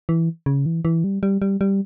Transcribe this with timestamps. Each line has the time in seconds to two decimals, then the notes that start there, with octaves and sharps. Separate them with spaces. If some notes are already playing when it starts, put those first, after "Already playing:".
0.09 E3
0.46 C#3
0.66 E3
0.85 E3
1.04 G3
1.23 G3
1.42 G3
1.61 G3